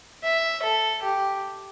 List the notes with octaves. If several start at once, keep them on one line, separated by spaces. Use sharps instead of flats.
E5
A4
G4